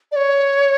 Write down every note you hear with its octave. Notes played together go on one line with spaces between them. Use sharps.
D5
C#5